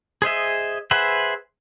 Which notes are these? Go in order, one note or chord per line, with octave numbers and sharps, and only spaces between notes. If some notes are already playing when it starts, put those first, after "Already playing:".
G#4 C5 D#5 E5
G#4 B4 C5 E5 F#5